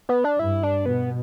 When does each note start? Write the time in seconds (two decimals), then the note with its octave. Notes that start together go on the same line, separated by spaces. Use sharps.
0.09 B3
0.24 D4
0.39 G2 E4
0.63 D4
0.85 B2 B3